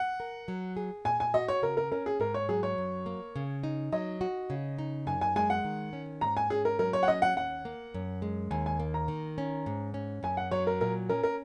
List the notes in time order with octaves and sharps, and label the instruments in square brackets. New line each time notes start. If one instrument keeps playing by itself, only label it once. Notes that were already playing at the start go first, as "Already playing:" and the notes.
Already playing: [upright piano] F#5
[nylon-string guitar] A#4
F#3
G#4
[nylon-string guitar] A#2 [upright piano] G#5
[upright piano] G#5
[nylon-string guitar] F#4 [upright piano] D#5
[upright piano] C#5
[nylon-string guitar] C#3 [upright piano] A#4
[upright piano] A#4
[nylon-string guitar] C#4 [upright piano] A#4
[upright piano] G#4
[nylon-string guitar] G#2 [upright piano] A#4
[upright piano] C#5
[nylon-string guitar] F#3 [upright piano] G#4
[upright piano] C#5
[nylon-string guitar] F#2
A#3
C#3
D#4
[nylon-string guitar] F#3 [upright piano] D#5
[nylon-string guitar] F#4
C#3
D#4
[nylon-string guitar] F#2 [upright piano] G#5
[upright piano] G#5
[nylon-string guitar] G#3 [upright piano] G#5
[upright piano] F#5
[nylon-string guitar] D#3
C#4
[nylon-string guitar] G#2 [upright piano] A#5
[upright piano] G#5
[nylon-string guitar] C#4 [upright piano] G#4
[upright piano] A#4
[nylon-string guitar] F#3 [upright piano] A#4
[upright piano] C#5
F#5
[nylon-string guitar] C#4 [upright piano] D#5
[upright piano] F#5
[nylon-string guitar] D#2 [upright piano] F#5
[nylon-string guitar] A#3
F#2
G#3
[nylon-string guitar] D#2 [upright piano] G#5
[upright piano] G#5
[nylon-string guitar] A#3
[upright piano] A#5
[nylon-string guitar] D#3
C#4
G#2
C#4
[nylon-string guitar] F#2 [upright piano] G#5
[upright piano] F#5
[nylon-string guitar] F#3 [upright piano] C#5
[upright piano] A#4
[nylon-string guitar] A#2 [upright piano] A#4
[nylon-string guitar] C#4 [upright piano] A#4
[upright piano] A#4